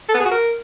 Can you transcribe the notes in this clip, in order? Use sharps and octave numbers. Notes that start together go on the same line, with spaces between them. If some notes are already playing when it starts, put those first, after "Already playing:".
A4
B3
G#4
F#4
A#4